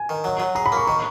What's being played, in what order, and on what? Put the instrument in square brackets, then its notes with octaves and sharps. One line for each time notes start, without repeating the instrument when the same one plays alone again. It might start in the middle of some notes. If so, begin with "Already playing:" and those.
Already playing: [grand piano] G#5
[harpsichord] D#3
F#3
F#3
[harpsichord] G#4 [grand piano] A#5
[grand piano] B5
[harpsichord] A#3 [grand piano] C#6
[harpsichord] D#3 [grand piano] C#6